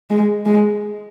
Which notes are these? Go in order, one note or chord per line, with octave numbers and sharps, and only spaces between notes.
G#3
G#3